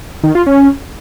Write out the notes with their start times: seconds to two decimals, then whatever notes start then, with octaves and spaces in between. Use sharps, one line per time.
0.24 D#3
0.35 F4
0.47 C#4